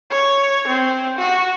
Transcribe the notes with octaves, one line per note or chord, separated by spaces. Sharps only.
C#5
C4
F#4